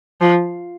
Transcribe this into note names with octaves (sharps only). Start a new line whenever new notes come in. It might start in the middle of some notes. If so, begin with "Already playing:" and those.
F3